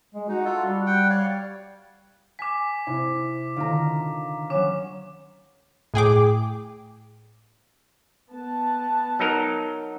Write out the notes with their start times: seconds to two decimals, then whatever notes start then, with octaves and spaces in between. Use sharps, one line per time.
0.15 G#3
0.29 D#4 F#4
0.45 F4 A4
0.65 G3 D4
0.86 F#5 G5
1.10 C#5 D5 F5
2.39 G#5 D6 B6
2.87 C3 E4
3.56 D3 D#3 F4 A#5
4.50 F#3 C#4 D6 E7
5.94 A2 G#4 G5 D6
8.32 B3 A5
9.19 F#3 D#4 A#4